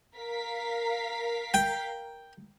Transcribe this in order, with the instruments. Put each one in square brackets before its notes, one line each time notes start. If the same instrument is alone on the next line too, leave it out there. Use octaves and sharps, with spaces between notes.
[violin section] A#4 F5 B6
[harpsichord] G5